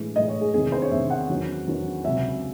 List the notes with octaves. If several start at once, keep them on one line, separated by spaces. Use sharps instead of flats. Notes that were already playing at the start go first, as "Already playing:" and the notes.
Already playing: A2 E3 G#3
A2 E3 G#3 D#5
C#5
G#4
E2 C3 D#3 G#4
C5
C#5
E2 C3 D#3 E5
F#5
E2 D#3 F#3 C#4
E2 D#3 F#3 C#4
C#2 C3 F#3 C#4 E5